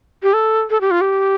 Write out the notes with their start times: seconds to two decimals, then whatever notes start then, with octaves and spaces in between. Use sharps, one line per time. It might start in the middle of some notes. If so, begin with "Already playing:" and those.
0.23 G4
0.33 A4
0.70 A4
0.81 G4
0.91 F4
1.01 G4